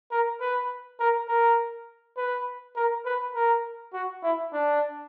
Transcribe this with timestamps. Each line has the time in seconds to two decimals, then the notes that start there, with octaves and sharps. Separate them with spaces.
0.11 A#4
0.40 B4
0.99 A#4
1.28 A#4
2.17 B4
2.76 A#4
3.05 B4
3.34 A#4
3.93 F#4
4.23 E4
4.53 D4